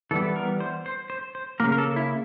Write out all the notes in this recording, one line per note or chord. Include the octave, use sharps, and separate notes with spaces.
E3 G3 B3 A4
A#4
C5
C5
C5
C5
C#3 F3 A#3 A#4
A#4
A4
E4